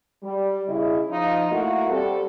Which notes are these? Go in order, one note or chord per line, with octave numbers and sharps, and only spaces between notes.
G3
C#3 E4 D#5
F3 D#4 F4
A3 A#3 E4 F#4
G3 C4 A4